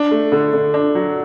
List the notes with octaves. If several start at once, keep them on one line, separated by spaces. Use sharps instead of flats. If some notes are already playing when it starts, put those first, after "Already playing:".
Already playing: D4
A3
D3
D3
D4
F#3